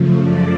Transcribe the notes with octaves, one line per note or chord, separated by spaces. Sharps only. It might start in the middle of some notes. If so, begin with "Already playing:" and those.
Already playing: F#2 C#3 F3 A3
D5